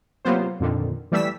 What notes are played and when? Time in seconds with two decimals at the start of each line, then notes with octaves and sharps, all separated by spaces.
0.25 C3 F#3 A#3 B3 F4 C5
0.60 F2 A#2 D3 D#3
1.12 E3 G3 A3 E6 B6